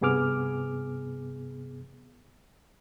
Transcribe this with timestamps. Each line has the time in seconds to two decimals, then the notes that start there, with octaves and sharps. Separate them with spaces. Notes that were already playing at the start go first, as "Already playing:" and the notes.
0.01 G2 C3 B3 G#4 D6 F6